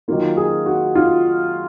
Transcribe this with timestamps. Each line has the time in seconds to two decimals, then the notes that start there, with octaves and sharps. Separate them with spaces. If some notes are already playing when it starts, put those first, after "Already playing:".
0.08 D#3 F#3 A#3 F4
0.37 G#4
0.66 F#4
0.95 F4